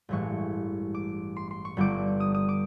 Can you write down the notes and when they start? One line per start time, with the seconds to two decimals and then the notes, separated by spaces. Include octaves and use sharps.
0.09 A1 G2 E3 G#3 C#6
0.94 D6
1.36 C6
1.51 C6
1.65 C#6
1.77 G1 G2 D3 G3 D6
2.20 D#6
2.34 D#6
2.49 D6